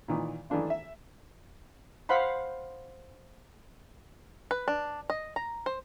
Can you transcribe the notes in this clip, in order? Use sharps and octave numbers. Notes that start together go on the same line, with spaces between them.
A#2 D#3 E3
D#3 E3 A3 D4 F4
E5
C5 F5 F#5 B5 C6
B4
D4
D#5
A#5
C5